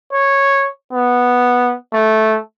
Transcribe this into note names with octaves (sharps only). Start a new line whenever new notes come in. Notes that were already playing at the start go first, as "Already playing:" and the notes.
C#5
B3
A3